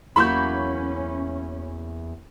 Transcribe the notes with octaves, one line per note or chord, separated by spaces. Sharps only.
E2 F#3 A#3 C#4 E4 B5 C#6 G6